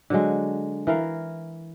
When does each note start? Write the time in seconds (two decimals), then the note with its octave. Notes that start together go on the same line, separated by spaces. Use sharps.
0.10 D3 F#3 G#3
0.87 E3 A#4 F5